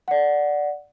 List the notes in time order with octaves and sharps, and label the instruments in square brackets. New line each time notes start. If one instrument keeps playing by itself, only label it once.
[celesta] D5 F#5